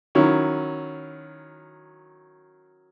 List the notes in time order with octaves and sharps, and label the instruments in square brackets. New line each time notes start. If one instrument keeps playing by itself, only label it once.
[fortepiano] D#3 F#3 C#4 E4